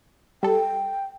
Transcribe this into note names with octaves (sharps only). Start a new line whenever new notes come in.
G3 A4 G5